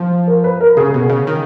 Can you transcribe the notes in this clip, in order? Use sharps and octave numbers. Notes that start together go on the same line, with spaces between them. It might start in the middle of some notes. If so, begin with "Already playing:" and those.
Already playing: F3
A#4
B4
A#4
C#3 G#4
B2
C#3
D#3